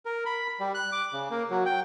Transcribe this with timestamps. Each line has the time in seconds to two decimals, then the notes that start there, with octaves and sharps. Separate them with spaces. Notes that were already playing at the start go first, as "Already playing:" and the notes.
0.05 A#4
0.26 B5
0.60 G3
0.74 F#6
0.92 D6
1.13 C#3
1.30 A#3
1.51 F#3
1.66 G5